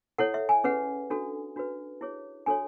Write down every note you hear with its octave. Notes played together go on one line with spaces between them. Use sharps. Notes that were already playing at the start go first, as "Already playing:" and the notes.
E4 A4 C#5 F#5
E5
G#5
C#4 G#4 B4 F#5
D4 F#4 A4
D4 F#4 B4
E4 G#4 C#5
D4 F#4 A4 C#5 G#5